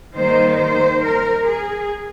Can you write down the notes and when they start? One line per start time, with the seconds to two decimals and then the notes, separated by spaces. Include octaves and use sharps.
0.14 D#3 G3 A#3 D#4 C5
0.58 C5
1.03 A#4
1.47 G#4